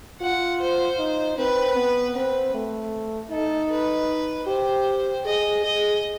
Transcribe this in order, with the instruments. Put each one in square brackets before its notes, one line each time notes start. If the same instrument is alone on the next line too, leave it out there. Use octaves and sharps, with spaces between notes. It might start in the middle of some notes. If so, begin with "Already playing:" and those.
[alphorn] F4 [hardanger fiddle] F#5
[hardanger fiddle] C5
[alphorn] D#4
[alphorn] C4 [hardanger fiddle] B4
[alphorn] B3
[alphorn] C4 [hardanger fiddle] B4
[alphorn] A3
[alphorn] D#4 [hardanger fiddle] A4
[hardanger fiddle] B4
[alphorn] G4 [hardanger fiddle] C5
[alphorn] G#4 [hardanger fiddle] D#5
[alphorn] G#4 [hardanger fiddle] D#5